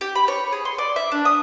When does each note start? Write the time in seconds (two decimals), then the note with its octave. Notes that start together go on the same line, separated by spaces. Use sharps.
0.01 G4
0.15 B5
0.28 C#5
0.52 G#4
0.65 C6
0.78 D5
0.96 E5
1.12 D4
1.25 D#6